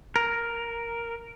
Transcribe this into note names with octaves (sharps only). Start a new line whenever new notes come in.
A#4